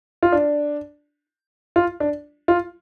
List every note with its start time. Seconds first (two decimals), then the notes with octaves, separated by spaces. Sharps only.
0.23 F4
0.32 D4
1.76 F4
2.00 D4
2.48 F4